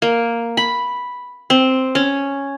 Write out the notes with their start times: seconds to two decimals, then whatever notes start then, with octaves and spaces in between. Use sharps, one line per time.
0.02 A#3
0.57 B5
1.50 C4
1.95 C#4